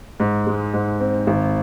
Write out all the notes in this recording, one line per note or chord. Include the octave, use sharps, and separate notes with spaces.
G#2
G#3
G#2
C4
G#1